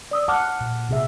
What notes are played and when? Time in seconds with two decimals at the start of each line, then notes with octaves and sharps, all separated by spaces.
0.11 D5 D#6 E6
0.28 F#5 A5 D6 F6
0.61 A#2
0.89 C3 G#4 E5